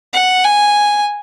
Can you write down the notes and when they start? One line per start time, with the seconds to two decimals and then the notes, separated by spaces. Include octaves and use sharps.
0.13 F#5
0.45 G#5